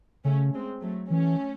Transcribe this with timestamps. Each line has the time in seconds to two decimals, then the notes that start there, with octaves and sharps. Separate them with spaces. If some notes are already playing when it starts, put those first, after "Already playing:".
0.25 C#3 A3 C#4
0.53 G#3 C4
0.82 F#3 A3
1.10 E3 A3 C#4